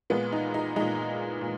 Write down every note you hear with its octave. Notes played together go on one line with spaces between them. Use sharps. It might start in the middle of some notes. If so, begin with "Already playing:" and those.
A#2 G#3 B3
D#4
D#4
A#2 G#3 D#4
A#2